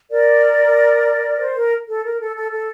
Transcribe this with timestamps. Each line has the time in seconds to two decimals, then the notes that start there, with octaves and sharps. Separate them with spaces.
0.10 A#4 D5
1.39 C5
1.56 A#4
1.88 A4
2.04 A#4
2.20 A4
2.35 A4
2.52 A4